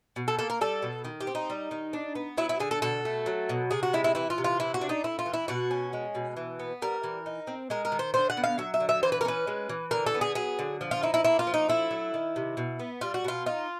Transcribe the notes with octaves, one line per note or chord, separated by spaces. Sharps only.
B2
A4
A#3 A4
A#4
G3 A4
B2
D#3
G4
C4
D#4
G3
D#3
D4
B3
F#3 E4
E4
D3 G#4
A4
B2 A4
A3
F#3
B2
C3 G#4
F#4
G#3 E4
E4
E3 E4
F4
C3
F4
E3 E4
F#4
D4
D#4
A3 E4
F4
E3
E4
B2 F#4
C#4
G#3
B2
E3
B3
G3 A#4
E3
D#4
C4
G#3 A#4
A#4
D#3
C5
D3 C5
F#5
B3
F5
F#3 E5
E5
D3
E5
E3 C5
B4
A#4
C#4 B4
G#3
E3
D3 A#4
A4
B3
G#4
F#3 G#4
D3
F3
F4
D#4 E4
E4
A#3 E4
F4
F3
D#4
A3 E4
F#3
D#3
C3
B2
B3
G3 F4
F#4
B2 F4
D#4 F4